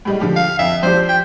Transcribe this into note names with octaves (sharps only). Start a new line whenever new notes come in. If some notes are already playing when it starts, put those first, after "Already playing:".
A2 G3 G#3
D3 F3 G4
F5
F2 E5
F3 D4 G4 C5
G5